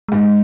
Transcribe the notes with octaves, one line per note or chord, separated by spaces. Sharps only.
G#2 G#3